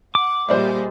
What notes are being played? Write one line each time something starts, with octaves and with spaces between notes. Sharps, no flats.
F#5 D6
A#2 G3 G#3 C5 D5 E5